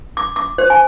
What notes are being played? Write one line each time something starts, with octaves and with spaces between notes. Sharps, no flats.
D6
D6
C5
G#5